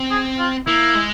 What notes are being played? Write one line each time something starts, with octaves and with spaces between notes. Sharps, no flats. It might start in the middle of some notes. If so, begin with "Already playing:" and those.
Already playing: C4
G#4
F4
A#3 E4
G#3